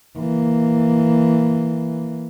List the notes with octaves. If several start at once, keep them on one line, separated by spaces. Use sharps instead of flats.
E3 A#3